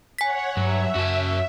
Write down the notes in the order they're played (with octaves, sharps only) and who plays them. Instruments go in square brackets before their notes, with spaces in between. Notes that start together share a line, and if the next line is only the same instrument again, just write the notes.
[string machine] C#5 F#5 [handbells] G#5 B6
[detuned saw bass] G2 [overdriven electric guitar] F#3 [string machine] E5
[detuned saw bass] F#2 [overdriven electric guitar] F#4 A5